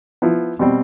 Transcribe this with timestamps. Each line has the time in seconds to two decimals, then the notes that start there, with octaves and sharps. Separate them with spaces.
0.22 F3 B3 E4
0.59 B2 G3 C4